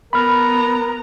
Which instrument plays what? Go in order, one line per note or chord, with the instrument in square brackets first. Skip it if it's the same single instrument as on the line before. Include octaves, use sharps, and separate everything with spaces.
[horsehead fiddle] B3 A#5 [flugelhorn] A#4 [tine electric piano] B5 F6